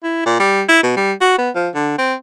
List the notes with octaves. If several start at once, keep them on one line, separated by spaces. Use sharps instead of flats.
E4
A#2
G3
E4
B2
G3
F#4
B3
F3
D3
C4